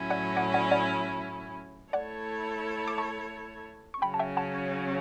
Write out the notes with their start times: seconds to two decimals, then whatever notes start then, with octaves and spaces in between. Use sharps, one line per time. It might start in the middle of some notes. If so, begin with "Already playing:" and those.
Already playing: A2 F#3 C#4 E4
0.10 D5 F#5
0.37 D5 F#5
0.54 D5 F#5
0.71 D5 F#5
1.93 A3 E4 A4 C#5 D5 F#5
2.88 D6
2.98 A5 C#6
3.94 C#6
4.02 C#3 F#3 C#4 G5 B5
4.14 A5
4.19 E5 G5
4.37 F#5 A5